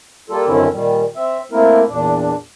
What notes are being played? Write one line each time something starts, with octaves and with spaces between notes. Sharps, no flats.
G3 A#3 F4 A4
F#2 D3 D#3 C4 C#4 E4
A#2 D#3 G3
C4 E5
A3 A#3 C4 E4 A#4
E2 A#2 D4